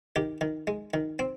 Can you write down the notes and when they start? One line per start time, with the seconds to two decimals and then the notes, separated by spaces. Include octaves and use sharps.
0.16 D#3 G4
0.41 D#3
0.67 G#3
0.94 D#3
1.19 C4